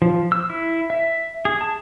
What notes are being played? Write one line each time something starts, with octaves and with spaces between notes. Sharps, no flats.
F3
E6
E4
E5
G#4
A5